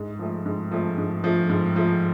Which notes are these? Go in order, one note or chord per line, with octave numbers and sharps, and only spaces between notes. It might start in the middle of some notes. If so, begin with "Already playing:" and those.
Already playing: G#2
F3 A3
G#2
F3 A3
G#2
F3 A3
G#2
F3 A3